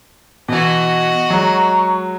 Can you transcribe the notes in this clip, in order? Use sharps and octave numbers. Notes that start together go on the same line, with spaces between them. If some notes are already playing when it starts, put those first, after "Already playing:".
B2 E3 F#4 D#5
F#3 G#3 A#5 C#6